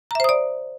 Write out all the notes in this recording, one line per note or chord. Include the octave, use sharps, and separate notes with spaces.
C5 D5 E5 A#5 D#6